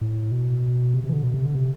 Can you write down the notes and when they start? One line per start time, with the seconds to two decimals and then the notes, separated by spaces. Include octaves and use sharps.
0.01 A2
0.32 B2
0.94 C3
1.04 C3
1.09 E3
1.13 D3
1.23 B2
1.34 C3
1.45 D3
1.55 C3